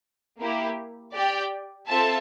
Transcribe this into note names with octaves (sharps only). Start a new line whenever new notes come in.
A#3 E4 G4
G4 D5 G5
C4 F4 A4 E5 A5